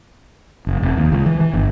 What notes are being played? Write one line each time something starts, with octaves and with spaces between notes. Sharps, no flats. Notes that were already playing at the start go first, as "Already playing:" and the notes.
F#1
F1
D#2
C#2
E3
E3
G1